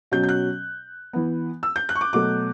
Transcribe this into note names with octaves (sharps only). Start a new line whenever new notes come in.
B2 F#3 C#4 G6
G6
F#6
E3 B3
E6
G6
F#6
C#6
D6
B2 F#3 A3 D6